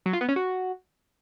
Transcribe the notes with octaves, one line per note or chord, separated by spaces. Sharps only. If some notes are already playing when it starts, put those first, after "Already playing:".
F#3
F4
B3
C#4
F#4